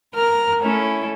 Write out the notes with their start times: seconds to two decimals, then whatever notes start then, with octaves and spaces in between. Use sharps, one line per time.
0.14 A#4 A#5 F6
0.61 A3 C#4 E4 A4